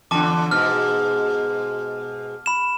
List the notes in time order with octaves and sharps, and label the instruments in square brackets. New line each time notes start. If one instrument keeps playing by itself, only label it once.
[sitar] E2 D3 [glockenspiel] A5 D6
[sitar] G#2 B2 [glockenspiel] F6
[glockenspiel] B5 E7